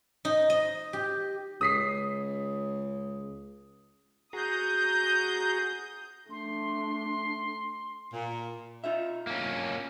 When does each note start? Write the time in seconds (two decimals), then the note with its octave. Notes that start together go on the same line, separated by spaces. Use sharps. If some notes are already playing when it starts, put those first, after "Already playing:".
0.25 D#4
0.50 D#5
0.93 G4
1.61 C#2 D#6 B6 C7
4.33 F#4 G#4 A#5 D#6 G6
6.31 A3 D4 C6
8.13 A#2
8.84 D#4 F4 E5
9.27 A#3 C#4